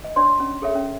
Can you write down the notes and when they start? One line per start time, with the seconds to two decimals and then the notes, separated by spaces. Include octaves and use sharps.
0.04 D#5
0.16 D4 C#5 D5 C6
0.40 C#4
0.62 G#4 A4 C#5 E5
0.75 C#4